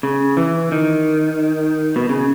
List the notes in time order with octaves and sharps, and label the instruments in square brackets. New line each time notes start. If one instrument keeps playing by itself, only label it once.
[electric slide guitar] C#3
E3
D#3
B2
C#3